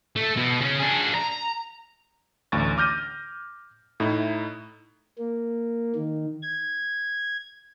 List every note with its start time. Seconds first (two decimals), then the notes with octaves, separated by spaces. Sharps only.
0.16 A3
0.37 B2
0.61 C#3 C#4
0.79 D4 G#4
1.15 A#5
2.52 A1 D2 C#6 A6
2.78 D6 F6 G6 A#6 D#7
4.00 A2 D#4 E4
5.18 A#3
5.95 D#3
6.42 G#6